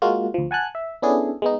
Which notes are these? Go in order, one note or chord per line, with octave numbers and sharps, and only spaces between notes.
G#3 A#3 F4 F#4
D2 F3
F#5 G#5 A5 F#6
E5
B3 C#4 D4 E4 G#4 A4
G#3 B3 D#4